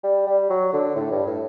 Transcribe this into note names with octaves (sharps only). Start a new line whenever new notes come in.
G3
G3
F#3
D3
A2
G2
A2